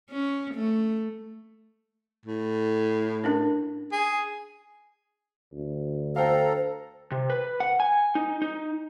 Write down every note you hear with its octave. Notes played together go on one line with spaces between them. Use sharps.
C#4
A3
A2
C#4 D4 A#4
G#4
D2
A4 C5 F5 G5 A#5
C3
B4
F#5
G#5
D#4
D#4